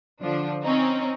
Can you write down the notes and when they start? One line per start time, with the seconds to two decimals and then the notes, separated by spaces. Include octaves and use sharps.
0.22 D3 F3 D4
0.63 C4 C#4 D#4